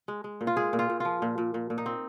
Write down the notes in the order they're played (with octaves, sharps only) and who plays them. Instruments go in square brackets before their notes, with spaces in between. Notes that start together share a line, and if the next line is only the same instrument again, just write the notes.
[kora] G#3
G#3
A#2
F4
G#3 G#4
A#2
F4
A#2
F3 F4
A#2
A#2
A#2
A#2
D#4
C4